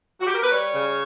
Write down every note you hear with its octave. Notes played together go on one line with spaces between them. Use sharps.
F#4
G4
A#4
B4
G3 C#5
C#3